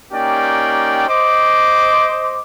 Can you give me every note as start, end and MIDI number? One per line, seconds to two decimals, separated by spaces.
0.12 1.07 58
0.12 1.07 61
0.12 1.07 63
0.12 1.07 67
0.12 1.07 74
0.12 1.07 79
1.08 2.40 72
1.08 2.40 75
1.08 2.40 86